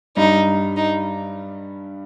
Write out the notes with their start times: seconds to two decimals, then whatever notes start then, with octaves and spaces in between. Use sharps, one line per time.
0.17 G2 G3 D#4
0.77 D#4